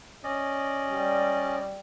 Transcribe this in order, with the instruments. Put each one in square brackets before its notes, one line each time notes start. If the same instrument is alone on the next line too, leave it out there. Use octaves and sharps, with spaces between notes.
[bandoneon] C#4 D5 D#5
[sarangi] G3